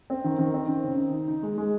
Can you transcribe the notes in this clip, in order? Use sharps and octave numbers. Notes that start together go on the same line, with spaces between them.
C4
D#3
D#3
C4
D#3
C#3
D#4
D#4
D#4
G#3
G#3